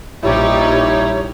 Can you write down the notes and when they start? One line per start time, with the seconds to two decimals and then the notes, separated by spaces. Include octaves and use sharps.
0.23 A#1 G3 D#4 E4 G4 C#5